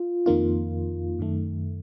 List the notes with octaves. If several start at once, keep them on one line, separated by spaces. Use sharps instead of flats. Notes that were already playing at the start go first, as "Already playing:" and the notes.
Already playing: F4
F2 D#3 A#3 F4
F#2 D#3 A3